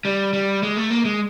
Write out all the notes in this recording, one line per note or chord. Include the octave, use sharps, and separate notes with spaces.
G3
G3
G#3
A3
A#3
G#3